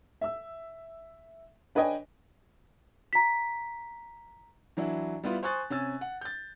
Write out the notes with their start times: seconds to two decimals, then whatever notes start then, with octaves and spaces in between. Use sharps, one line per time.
0.21 E5 E6
1.75 D4 B4 C#5 D#5 G5 G#5
3.13 A#5 B6
4.77 E3 F#3 D4 E4
5.23 G3 B3 E4 F4
5.43 C5 G#5 C#6 D#6 F#6 A6
5.70 C3 C#4 G#5 E6 A6
6.01 F#5
6.21 G6 A6